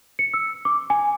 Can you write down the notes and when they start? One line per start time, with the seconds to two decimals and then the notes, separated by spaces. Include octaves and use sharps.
0.19 C#7
0.34 E6
0.65 D6
0.90 G#5